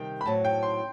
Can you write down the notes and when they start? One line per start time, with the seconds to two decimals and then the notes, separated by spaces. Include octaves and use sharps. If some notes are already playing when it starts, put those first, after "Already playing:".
Already playing: C3 D#3 G3 G5
0.21 B5
0.25 A2 F#3 C4 A5
0.45 G5
0.63 C6